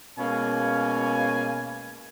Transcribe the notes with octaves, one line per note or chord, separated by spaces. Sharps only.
B2 G#3 A#3 C#4 F5 G#5